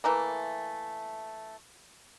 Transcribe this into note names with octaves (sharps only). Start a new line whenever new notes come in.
E3 A3 A#3